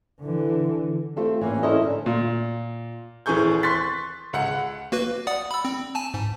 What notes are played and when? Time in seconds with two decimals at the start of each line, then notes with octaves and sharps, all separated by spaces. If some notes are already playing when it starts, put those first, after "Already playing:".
0.22 D3 E3
1.16 A3 C4 F4 G4 A4
1.41 E3 A#3 C#4
1.63 C#4 E4 A4 A#4 C5 D#5
1.82 D3 E3
2.06 A#2
3.26 D#1 E3 C4 G#4 C#6 G6
3.63 C6 C#6 F#6 A6 B6
4.33 C#2 F#5 C#7
4.92 A#3 F#4 B4
5.27 D5 F#5 D#6
5.51 B5 E6
5.65 C4
5.95 G#5 A5
6.14 G#2